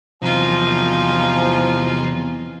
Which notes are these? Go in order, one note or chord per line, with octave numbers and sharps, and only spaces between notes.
E2 C3 F3 F#3 D#4 F4 G#5